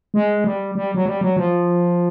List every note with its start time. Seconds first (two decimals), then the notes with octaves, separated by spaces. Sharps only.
0.14 G#3
0.44 G3
0.75 G3
0.95 F#3
1.06 G3
1.21 F#3
1.37 F3